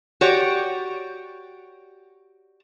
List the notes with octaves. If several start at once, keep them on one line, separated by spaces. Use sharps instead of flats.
F#4 G4 C#5 D5